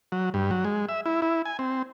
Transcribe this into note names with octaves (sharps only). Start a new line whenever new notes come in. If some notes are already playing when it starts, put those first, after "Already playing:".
F#3
G2
F#3
G#3
E5
E4
E4
G#5
C4